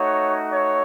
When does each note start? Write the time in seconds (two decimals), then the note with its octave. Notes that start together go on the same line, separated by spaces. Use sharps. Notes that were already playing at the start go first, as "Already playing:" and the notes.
Already playing: A3 D#4 F#4 C#5
0.53 C#5